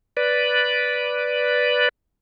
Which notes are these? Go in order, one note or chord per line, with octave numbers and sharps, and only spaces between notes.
B4 D5